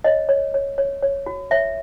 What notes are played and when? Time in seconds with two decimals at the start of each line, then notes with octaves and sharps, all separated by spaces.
0.04 C#5 D#5
0.29 C#5
0.54 C#5
0.78 C#5
1.02 C#5
1.26 F#4
1.51 C#5 E5